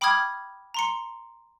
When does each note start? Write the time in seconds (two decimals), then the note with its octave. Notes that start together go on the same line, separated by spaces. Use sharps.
0.01 G5 B5 D6 D#6 F6 G#6
0.74 A#5 C6 C#7